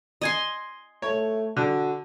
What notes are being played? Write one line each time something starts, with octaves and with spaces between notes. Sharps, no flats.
D#5 G#5 C6
A3 C#5
D3 F#4